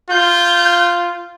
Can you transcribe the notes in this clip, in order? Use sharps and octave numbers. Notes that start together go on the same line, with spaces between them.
F4 G6